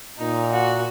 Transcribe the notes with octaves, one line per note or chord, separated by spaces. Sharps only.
A#2 D#4
F#4